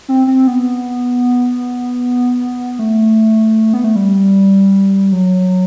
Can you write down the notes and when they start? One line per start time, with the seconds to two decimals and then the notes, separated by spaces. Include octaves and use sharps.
0.09 C4
0.27 C4
0.47 B3
2.79 A3
3.74 B3
3.84 A3
3.96 G3
5.12 F#3